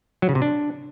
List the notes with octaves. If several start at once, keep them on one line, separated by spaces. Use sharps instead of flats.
F#3
C#3
C3
D4